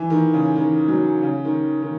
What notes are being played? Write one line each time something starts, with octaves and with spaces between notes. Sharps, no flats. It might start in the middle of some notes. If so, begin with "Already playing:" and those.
Already playing: E3
D#3
C#3
D#3
F#3
C#3
D#3
D#3